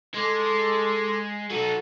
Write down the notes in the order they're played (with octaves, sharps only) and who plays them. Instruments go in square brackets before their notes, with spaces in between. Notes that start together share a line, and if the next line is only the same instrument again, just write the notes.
[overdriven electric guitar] G#3 [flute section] A4 C6 D6
[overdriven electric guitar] F#3 D#4 [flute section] A4 F#5